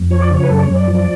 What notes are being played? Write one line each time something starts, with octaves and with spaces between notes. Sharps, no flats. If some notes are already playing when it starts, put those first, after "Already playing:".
Already playing: F2
F3 C#5
D5
C#3 C#5
B4
F#2 A4
D5
C#5
F#2
D5
F3